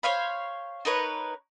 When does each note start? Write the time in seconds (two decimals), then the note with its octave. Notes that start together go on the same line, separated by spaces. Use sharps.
0.03 C5 C#5 F5 B5
0.85 D#4 A#4 B4 C#5